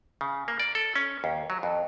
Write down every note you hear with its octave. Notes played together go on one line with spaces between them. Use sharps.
C#3
A#3
D5
A4
C#4
D#2
F#3
F2